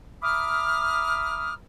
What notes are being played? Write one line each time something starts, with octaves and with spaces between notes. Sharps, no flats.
E5 A#5 B5 D6 D#6 F6